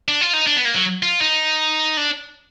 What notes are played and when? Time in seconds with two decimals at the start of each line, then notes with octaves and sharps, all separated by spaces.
0.08 D4
0.21 F4
0.33 D#4
0.47 D4
0.56 B3
0.65 A#3
0.74 F#3
1.03 F4
1.21 D#4
1.97 D4